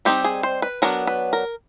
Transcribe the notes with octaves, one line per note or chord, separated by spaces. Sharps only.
G3 C4 D#4 G4
G#4
C5
B4
F#3 B3 D4 A#4
B4
A#4